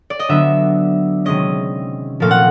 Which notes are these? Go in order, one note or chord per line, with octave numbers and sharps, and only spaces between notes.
D5
D#5
D3 F#3 B3 D4 E5
C3 D#3 G#3 C#4 D#5
A#2 F3 A3 C4 F5
F#5